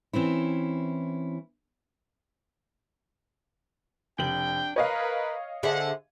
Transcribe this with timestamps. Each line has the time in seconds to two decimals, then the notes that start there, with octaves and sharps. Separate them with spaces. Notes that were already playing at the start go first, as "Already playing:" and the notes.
0.13 E3 C4 C#4 E4
4.19 F1 D4 G5 F#7
4.76 A#4 B4 C#5 D#5 F5
5.63 D3 G#4 A4 C5 E5 F#5